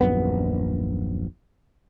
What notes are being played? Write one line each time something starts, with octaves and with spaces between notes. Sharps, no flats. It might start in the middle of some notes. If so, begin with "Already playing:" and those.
D#1 A#1 F#2 B3